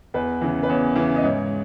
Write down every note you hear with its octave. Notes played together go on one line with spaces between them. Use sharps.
E2 B4
C#3 E3
B4
E2 C#5
C#3 E3
D#5
G#2 C#5